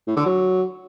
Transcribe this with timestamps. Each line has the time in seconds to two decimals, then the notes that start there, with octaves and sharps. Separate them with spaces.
0.07 A2
0.17 D3
0.26 F#3